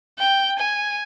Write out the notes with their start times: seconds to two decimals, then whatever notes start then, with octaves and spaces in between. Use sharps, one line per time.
0.19 G5
0.59 G#5